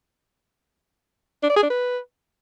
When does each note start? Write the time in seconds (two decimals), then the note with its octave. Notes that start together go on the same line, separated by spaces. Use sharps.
1.43 D4
1.50 D5
1.56 G#4
1.63 D4
1.70 B4